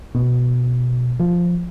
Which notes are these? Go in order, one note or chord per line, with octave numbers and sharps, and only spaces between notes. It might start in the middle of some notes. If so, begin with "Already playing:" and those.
B2
F3